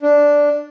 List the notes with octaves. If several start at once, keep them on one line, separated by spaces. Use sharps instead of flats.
D4